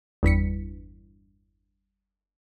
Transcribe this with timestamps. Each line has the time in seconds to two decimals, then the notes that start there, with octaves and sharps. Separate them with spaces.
0.23 G1 E2 B6 C#7